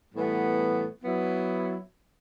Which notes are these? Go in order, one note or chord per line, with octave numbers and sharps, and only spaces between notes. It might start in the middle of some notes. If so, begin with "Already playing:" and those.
A2 E3 G3 B3
F#3 B3 E4